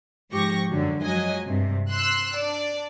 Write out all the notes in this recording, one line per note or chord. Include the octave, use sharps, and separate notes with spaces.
G#2 F3 G4 C#6 A#6
F#2 D3 F#3
F3 F#3 G#3 D#5 G#5
G2 C3
C6 E6 F#6
D4 D5